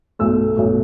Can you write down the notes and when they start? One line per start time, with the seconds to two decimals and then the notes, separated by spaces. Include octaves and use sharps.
0.19 B1 B2 A3 E6
0.57 B1 B2 A3